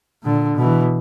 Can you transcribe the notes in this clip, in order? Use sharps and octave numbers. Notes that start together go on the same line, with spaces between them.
A#2 D3
B2 E3